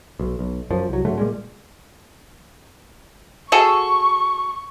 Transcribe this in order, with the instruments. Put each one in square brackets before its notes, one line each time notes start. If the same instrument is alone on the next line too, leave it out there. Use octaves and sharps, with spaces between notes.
[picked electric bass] B1
B1
F#2 F3
C2 F#3
G#2 D3 F#3 A3
A#2 G3 G#3
[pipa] F#4 G#4 A4 [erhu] C#6